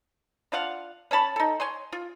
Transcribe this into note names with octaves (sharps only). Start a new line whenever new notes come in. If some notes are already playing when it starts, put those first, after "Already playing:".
D4 F4 F5 F#5
C#4 C#5 A5 B5
D#4 A4
C#5 G#5 C6
F4